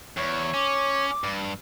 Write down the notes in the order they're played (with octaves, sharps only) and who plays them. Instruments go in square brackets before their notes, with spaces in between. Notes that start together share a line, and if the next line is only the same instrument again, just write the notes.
[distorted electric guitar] E2 [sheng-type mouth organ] C#5
[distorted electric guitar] C#4 [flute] D6
[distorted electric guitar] G2